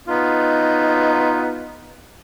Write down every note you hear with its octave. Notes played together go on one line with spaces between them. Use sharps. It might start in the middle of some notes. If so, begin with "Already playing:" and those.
B3 D#4 F4